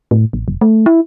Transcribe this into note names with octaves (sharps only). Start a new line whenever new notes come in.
A2
A1
F1
A3
E4